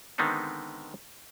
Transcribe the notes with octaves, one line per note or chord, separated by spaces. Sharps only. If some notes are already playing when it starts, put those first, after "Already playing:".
D3 D#3 G#3 B3 C4 D#4